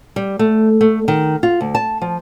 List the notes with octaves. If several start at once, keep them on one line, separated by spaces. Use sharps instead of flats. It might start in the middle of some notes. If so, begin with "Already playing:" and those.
G3
A3
A3
D#3
F4
D2
A5
F3